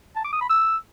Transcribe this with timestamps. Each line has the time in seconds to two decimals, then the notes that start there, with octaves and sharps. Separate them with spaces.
0.16 A5
0.24 D6
0.33 D#6
0.41 B5
0.49 E6